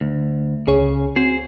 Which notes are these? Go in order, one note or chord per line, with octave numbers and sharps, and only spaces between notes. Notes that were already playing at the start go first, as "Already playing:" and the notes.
D2
C#2 C#3 G#4 C#5
C4 F#4 G#4 C5